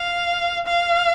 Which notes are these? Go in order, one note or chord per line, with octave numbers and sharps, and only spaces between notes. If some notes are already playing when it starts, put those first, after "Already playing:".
Already playing: F5
F5